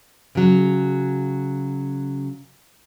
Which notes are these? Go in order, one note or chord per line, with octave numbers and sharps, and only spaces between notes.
C#3 F#3